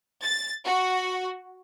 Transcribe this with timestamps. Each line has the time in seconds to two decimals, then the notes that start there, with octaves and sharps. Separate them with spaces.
0.25 A6
0.65 F#4